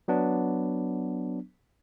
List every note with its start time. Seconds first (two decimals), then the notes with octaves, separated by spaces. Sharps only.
0.08 F#3 B3 D4